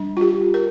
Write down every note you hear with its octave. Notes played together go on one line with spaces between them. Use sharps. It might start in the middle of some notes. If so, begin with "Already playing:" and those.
Already playing: G3 D4
F4
G4
A#4